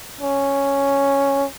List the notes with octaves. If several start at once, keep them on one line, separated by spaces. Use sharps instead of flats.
C#4